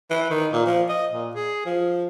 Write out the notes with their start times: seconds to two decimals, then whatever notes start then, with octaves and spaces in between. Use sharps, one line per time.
0.11 E3
0.30 D#3
0.53 A#2
0.66 F3
0.89 D#5
1.13 A#2
1.35 G#4
1.66 F3